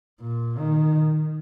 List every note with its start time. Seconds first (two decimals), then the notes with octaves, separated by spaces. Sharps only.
0.20 A#2
0.59 D#3